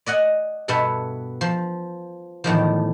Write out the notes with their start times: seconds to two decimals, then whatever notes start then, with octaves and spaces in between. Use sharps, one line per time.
0.06 D5 D#5 F#5 G#5
0.68 G2 B2 B3 A4 E5 A5
1.41 F3
2.44 E2 A2 D#3 F3